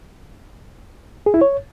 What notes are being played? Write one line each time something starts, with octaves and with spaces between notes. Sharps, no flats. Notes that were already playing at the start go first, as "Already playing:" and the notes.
G#4
E4
C#5